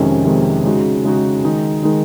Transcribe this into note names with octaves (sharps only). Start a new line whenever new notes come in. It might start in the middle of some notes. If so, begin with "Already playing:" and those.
Already playing: F2 C3 D#3 G#3 C#4
F2 C3 D#3 G#3 C#4
C#3 G#3 D#4 F#4
C#3 G#3 D#4 F#4
D#3 G#3 D#4
D#3 G#3 D#4